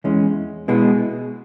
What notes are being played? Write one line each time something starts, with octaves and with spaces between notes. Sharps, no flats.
E2 E3 G#3 C#4
B2 G#3 B3 E4 G#4